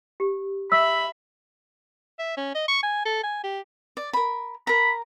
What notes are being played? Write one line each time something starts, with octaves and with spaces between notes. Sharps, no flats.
G4
E5 B5 E6
E5
C#4
D#5
C#6
G#5
A4
G#5
G4
D5
A#4 B5
A#4 A#5 B5